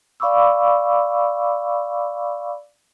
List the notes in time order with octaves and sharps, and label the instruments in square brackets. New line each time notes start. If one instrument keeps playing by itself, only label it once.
[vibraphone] D5 F5 B5 C#6 D6 E6